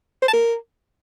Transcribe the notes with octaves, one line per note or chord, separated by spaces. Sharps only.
C5
A5
A#4